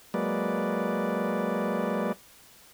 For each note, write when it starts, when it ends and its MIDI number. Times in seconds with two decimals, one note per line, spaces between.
0.14 2.12 54
0.14 2.12 56
0.14 2.12 58
0.14 2.12 71
0.14 2.12 74